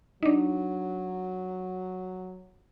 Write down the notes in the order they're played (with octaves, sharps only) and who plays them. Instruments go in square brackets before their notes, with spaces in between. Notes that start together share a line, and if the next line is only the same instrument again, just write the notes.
[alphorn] F#3 [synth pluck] D4 D#4